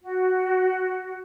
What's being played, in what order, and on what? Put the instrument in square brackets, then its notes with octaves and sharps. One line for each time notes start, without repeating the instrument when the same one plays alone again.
[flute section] F#4